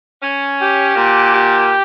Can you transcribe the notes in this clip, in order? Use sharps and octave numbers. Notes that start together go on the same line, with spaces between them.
C#4
G4
A#2
G4